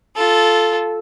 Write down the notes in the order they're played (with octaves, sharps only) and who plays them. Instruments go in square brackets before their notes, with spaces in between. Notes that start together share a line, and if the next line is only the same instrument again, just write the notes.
[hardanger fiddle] F4 A4